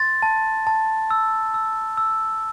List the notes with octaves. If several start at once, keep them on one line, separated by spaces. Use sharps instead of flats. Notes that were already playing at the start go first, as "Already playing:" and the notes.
Already playing: C6 A6
A5
A5
E6
E6
E6